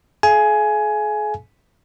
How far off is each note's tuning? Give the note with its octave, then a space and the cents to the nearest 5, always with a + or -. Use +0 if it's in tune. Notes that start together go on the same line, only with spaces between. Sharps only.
G#4 +45 F5 -45 G#5 +15